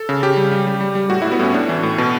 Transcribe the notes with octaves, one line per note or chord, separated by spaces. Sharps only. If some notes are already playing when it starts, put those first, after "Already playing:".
Already playing: A4
C#3
C#3 G4
G3
G3
G3
G3
G3
A2 F#4
A2 E4
B3
A2 C#4
A2 D4
E3
A2
B2